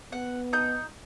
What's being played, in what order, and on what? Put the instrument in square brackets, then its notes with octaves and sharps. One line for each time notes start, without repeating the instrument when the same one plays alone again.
[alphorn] B3 [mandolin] F#5
[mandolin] D#4 D#6 G6